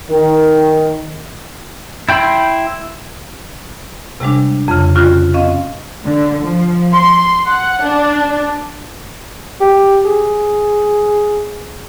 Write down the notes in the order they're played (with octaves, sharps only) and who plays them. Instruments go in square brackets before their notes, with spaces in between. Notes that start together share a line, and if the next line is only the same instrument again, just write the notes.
[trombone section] D#3
[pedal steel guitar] E4 G5 B5 C6
[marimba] C3 G3 G#3 D4
F2 C#3
C#4 F4 F#4
C4 C#4 D#5 F5
[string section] D3
F3
C6
F#5
D4
[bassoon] G4
G#4